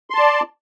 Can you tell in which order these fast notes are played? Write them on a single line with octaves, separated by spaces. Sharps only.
C6 A5 D5